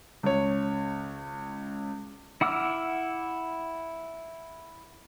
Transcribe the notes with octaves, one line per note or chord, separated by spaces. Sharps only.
C#2 C#5
E4 F#5 D6 E6 F6